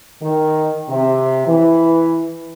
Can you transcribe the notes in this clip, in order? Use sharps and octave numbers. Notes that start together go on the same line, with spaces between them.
D#3
C3
E3